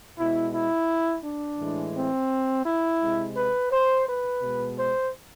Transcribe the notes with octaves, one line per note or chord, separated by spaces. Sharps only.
B2 G#3 E4
E4
D4
A2 E3 G#3
C4
E4
C3 G#3
B4
C5
B4
B2 G#3
C5